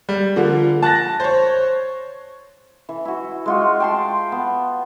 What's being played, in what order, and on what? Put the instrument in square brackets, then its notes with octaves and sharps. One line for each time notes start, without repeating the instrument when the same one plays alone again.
[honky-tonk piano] G3
D3 F3 A#3
A5 F#6 A6 A#6
C5 C#5
[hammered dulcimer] E3
E4 F#4
G#3 F4 F#4
G5 A5 C6
B3